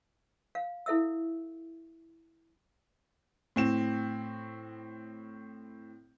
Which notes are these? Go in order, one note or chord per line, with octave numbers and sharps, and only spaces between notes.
F5
E4 A4 E5 E6
A2 C4 E7